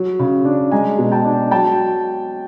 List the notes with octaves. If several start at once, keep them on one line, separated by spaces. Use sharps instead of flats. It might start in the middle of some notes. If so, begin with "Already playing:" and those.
Already playing: F#3
C#3
D4
G#3 G#5 A#5
B2
G5 A5
D4
F#3 G5 A5